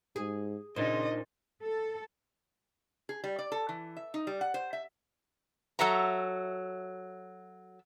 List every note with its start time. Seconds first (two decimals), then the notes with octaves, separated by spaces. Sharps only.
0.16 G#2 G#4
0.76 A#2 C#3 D4 D#4 C5 D#5
1.62 A4
3.09 G#4
3.24 G3
3.39 D5
3.52 A4
3.69 E3
3.97 E5
4.14 D#4
4.27 G3
4.41 F#5
4.54 C5
4.73 E5
5.79 F#3 A4 E5 A#5